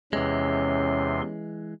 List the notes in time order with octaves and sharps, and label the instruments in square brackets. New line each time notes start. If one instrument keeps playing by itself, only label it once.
[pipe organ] E2 C3 C6 [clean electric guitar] E3 G#3 [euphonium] C#4